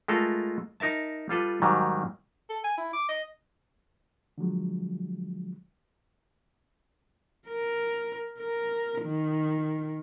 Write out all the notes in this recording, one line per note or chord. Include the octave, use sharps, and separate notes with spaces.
G#3 A3 F4 A4 A#4 F5
D#4 A#4 E5 A5
G3 F4 A4 B4
G#2 D#3 F#3 G3
A4
G#5
E4
D6
D#5
D3 F3 F#3 G#3
A#4
A#4
D#3